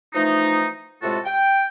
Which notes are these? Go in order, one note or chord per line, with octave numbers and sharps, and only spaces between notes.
E3 F3 A3 D#4
A2 C3 G#3 F4 F#4 A4
G5